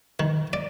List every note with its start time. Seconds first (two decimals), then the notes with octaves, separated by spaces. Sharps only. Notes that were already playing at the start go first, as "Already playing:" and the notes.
0.20 D#3
0.53 D5